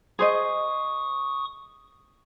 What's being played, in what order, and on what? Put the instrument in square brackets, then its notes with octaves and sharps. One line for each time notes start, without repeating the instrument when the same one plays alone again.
[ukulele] G#4 C5 D#5 [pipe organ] C#6 D#6